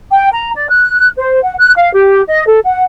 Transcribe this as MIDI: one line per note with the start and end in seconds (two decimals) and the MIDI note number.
0.11 0.27 79
0.32 0.50 82
0.55 0.68 74
0.70 1.10 90
1.17 1.39 72
1.41 1.54 78
1.59 1.72 90
1.75 1.92 77
1.93 2.22 67
2.29 2.45 75
2.46 2.59 69
2.64 2.82 78